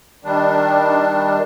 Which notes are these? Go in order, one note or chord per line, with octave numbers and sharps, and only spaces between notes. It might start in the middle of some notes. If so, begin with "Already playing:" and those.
D#3 G3 D4